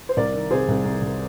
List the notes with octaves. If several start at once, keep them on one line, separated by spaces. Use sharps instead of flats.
C5
C2 A#4 D5
D#3
C3 G#4 C5
C2
C2
C2